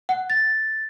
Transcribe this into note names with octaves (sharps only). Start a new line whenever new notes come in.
F#5
A6